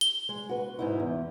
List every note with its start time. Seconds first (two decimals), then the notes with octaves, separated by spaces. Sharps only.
0.01 G7
0.29 G#3
0.49 F#4 B4
0.79 G#2 D#4 E4
1.00 E2